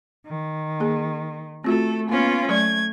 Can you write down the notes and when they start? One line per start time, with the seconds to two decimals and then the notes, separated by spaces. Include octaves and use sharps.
0.27 D#3
0.80 A#3 G#4
1.64 A3 C4 F4 F#4 A4
2.09 A#3 B3 C#4 F4
2.49 F#3 A3 D5 G#6